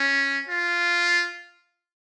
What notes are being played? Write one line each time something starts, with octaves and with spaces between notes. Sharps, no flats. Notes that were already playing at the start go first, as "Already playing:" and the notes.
Already playing: C#4
F4